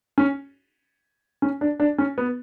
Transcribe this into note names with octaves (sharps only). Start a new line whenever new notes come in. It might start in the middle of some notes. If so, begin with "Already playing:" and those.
C#4
C#4
D4
D4
C#4
B3